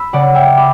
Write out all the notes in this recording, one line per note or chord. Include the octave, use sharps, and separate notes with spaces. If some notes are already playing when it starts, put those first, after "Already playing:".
Already playing: B5 E6
C#3 D5 F#5
E5 G5
B5 D6